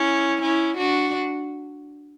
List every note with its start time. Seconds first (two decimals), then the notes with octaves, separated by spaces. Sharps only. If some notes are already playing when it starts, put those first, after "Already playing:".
Already playing: C#4 E4
0.42 C#4 E4
0.77 D4 F#4